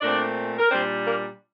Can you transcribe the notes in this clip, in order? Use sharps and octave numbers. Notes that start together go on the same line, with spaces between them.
A#2 A3 C4 D4 D5
A#4
A#2 G3 C4 D4 C5
A#3 A#4